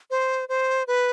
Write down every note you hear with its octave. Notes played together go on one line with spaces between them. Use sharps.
C5
C5
B4